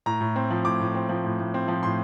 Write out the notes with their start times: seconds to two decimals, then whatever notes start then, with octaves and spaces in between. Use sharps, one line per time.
0.06 A2 A#5
0.21 A2
0.36 C4
0.51 F3
0.65 A2 D6
0.80 A2
0.95 C4
1.09 F3
1.25 A2
1.40 A2
1.54 C4
1.68 F3
1.83 A2 C6